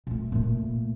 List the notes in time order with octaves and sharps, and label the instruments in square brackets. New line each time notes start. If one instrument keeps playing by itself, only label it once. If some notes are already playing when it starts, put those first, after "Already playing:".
[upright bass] A#2 A3
A#2 A3